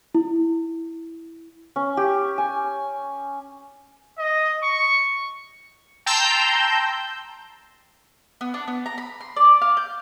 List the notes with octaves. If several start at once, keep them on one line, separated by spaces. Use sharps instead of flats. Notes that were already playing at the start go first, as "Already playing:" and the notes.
E4
C#4
G4
G#5
D#5
C#6
G5 A5 A#5 C6 E6 G6
B3
D4
B3
A#5
B5
C6
D5
F5
G6